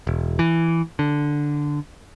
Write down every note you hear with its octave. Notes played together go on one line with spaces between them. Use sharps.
E1
E3
D3